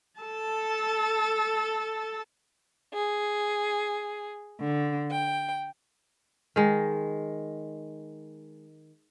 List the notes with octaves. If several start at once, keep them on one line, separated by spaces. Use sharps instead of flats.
A4 A5
G#4
D3
G5
D#3 G#3